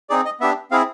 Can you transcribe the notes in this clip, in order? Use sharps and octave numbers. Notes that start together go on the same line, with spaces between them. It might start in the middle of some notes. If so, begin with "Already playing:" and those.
C4 D#4 G#4 D5
D#5
B3 D4 G4 E5
C4 E4 G#4 F5